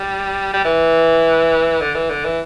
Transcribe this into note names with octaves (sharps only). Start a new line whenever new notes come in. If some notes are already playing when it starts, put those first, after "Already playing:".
Already playing: G3
G3
E3
D3
E3
D3
E3